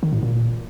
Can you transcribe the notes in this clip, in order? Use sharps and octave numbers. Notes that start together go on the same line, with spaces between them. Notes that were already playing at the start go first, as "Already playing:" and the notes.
D#3
A2
A#2